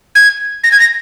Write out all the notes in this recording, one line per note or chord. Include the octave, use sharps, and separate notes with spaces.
G#6
A#6
G#6
A#6